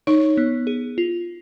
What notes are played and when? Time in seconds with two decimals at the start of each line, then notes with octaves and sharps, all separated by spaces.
0.07 D#4 C#5
0.37 B3
0.67 G#4
0.98 F4